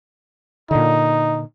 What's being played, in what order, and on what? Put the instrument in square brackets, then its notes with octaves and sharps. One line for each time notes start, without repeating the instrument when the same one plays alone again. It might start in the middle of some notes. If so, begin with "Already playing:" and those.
[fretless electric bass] A#2 D3 [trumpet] D#4